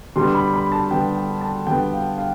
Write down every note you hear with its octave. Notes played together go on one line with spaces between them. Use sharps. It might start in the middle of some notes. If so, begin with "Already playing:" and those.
D3 G3 B3 C6
B5
B5
A5
D3 G3 B3 G5
G5
A5
D3 G3 B3 G5
F5
F5